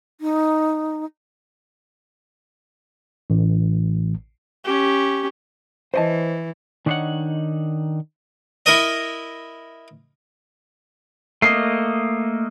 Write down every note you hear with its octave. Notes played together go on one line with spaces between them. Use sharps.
D#4
A1
C#4 G4
E3 C5 D#5 A5
D#3 D4 D#4 C5 C#5 F#5
E4 A#4 D#5
A3 A#3 D#5 C7